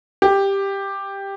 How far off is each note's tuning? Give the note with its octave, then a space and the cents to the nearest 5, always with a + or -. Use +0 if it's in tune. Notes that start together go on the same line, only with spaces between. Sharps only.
G4 +5